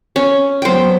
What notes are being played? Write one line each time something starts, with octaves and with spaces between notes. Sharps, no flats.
C#4
F#3 G3 B3 C5 G5